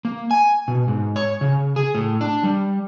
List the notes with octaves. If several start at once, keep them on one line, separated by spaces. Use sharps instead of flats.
A#3
G#5
B2
G#2
C#5
C#3
G#4
A2
D4
G3